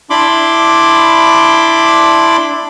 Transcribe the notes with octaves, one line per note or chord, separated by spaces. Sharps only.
D4 E4 B5 C6 D6